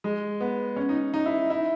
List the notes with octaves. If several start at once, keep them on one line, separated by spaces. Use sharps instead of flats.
G#3
B3
C#4
D#4
D#4
E4
E4